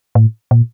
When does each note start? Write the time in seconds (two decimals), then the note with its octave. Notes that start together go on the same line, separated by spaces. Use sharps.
0.15 A2
0.51 A#2